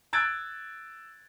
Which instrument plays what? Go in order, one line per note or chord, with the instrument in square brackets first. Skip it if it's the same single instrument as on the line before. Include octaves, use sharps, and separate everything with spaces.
[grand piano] E6 F#6 G#6 A6 D7